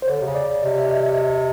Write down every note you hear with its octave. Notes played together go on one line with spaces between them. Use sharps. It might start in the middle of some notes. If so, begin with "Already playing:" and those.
C5
D3 C#5
C3
C#3
D5
C#3
C3 D#5
E5
D#5
D#5